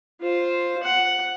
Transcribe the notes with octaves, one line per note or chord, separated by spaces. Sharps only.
F4 C5
F#5